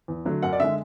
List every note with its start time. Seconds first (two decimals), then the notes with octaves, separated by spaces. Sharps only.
0.08 E2
0.25 D3 F#3 A3
0.42 F#2 F#5
0.53 D5
0.60 D3 G#3 E5